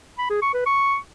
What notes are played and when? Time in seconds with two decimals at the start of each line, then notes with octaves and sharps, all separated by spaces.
0.18 B5
0.30 G#4
0.42 C#6
0.54 B4
0.66 C#6